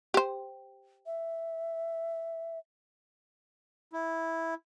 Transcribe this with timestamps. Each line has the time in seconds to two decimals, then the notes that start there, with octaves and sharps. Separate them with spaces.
0.14 G4 C5
1.06 E5
3.93 E4